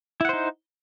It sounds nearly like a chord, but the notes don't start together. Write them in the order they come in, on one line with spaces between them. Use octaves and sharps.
E4 F#5 C5 D#4